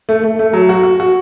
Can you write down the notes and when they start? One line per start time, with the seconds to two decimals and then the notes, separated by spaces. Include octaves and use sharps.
0.09 A3
0.23 A3
0.39 A3
0.53 F#3
0.69 F#4
0.83 F#4
1.00 F#4